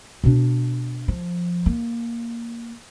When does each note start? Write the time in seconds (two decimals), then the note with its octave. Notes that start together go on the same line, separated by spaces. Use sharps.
0.24 B2 D4
1.08 F3
1.66 A#3